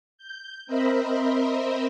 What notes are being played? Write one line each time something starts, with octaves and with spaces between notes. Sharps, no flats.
G6
C4 A#4 C5 D#5 E5 B5